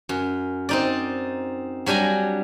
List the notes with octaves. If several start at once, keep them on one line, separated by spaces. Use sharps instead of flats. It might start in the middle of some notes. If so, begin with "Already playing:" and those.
F#2
C4 D#4 D5
F#3 G3 D4 G#5 A#5